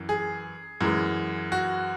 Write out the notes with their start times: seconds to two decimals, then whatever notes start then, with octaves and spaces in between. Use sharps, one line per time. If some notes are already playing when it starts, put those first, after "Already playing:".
Already playing: F#2 E3
0.09 G#4
0.81 F#2 E3 G#3
1.52 F#4